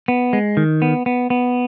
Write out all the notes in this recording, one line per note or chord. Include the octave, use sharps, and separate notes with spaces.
B3
G#3
D#3
B3
B3
B3